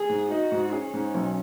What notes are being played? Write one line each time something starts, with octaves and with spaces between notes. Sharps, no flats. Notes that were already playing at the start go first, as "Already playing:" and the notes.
Already playing: G#4
G#2
D#4 F#4
G#2
C#4 G#4
G#2
B1